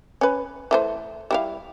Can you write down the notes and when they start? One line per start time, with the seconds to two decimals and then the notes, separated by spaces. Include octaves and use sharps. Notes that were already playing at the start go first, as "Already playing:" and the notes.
0.21 C#4 B4
0.71 E3 A3 C5
1.31 G3 E4 F5